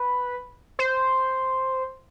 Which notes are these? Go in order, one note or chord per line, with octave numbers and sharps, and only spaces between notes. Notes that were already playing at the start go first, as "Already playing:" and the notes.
Already playing: B4
C5